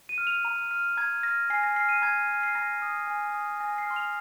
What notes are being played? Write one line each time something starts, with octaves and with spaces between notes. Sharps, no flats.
D#7
F6
F7
A#5
F6
A#5 G#6
F6 A#6
G#5 C7
A#6
F6 C7
D#7
A#5 G#6
F6
C7
A#5 A#6
D#6
G#5
D#6
G#5 A#6
C7
C6 F6
F7